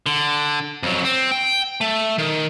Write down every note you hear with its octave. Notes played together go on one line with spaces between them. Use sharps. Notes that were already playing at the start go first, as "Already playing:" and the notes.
D3
F2 F#3
C4
G5
A3
D#3